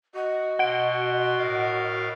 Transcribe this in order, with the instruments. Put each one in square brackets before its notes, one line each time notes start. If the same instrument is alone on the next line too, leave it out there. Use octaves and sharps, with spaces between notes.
[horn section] F#4 [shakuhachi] D#5
[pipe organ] B2 C6 [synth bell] F#5 D7
[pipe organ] A2 A#4 F5